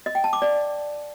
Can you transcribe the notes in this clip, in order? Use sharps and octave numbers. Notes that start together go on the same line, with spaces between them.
D#5
G5
A5
D6
D5